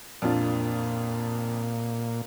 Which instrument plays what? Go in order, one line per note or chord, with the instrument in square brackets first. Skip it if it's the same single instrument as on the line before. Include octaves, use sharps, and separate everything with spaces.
[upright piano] F2 D4 F4 [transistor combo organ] A#2